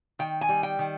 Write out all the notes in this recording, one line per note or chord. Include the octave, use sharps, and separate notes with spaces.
D#3 G5
G#5
G3
G5
D#3